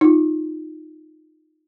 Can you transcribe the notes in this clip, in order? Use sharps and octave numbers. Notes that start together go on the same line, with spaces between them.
D#4 F4